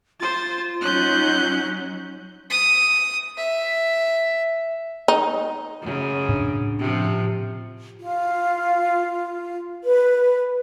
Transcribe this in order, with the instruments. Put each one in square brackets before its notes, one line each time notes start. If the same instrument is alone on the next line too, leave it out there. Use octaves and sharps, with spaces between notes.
[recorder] F4 [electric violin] C5 A6
[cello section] F#3 C#4 [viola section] D#4 [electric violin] F#6 G6
[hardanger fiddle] D#6
E5
[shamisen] D#4
[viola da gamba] F#2 C#3
[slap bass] A2 D4
[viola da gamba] C3 F3
[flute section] F4
B4